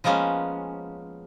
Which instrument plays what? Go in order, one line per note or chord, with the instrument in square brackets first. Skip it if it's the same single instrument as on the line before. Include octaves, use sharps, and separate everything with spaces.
[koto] F3 G#3 A#3 B3 C#4